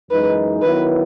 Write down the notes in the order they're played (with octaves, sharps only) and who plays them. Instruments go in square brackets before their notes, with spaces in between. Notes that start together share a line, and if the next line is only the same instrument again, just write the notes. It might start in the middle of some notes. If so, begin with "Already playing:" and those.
[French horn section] F#2 E3 G#3 D#4 [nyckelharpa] B4
[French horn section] D#3 F#3 B3 E4 [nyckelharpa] B4